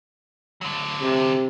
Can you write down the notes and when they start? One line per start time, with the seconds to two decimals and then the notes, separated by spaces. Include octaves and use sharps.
0.61 D3 F#3
1.00 C3